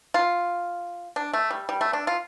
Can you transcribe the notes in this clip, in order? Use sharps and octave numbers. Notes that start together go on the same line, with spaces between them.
F4
D4
A3
G3
G3
A3
D4
F4